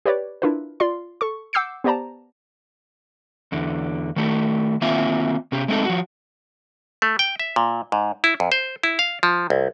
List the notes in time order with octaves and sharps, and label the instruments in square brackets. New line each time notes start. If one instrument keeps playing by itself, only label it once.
[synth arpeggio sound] G4 B4 C#5 D5
D4 E4 F4 A#4 B4
F4 D5 C6
A4 C#6
F#5 D6 E6 G6 C7 C#7
B3 G4 C5 D5 A5 A#5
[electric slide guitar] E2 D3
D#3 A3 G4
D#3 A#3 C4 F4 E5 G#5
C3 C#4 G4
G#3 A3 C4 D#4 A4
F3 F#4
[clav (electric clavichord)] A3
G5
E5
A#2
G#2
E4
F2
C5
E4
F5
F3
C2